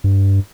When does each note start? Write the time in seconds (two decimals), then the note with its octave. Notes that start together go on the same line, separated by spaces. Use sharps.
0.04 G2